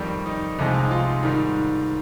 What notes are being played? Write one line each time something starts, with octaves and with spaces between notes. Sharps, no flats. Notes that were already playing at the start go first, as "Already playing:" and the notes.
Already playing: F2 D#3 G3 D#4
D#4
C2 C3 F3 G#3 D#4
D#4
F4
G#2 D#3 G3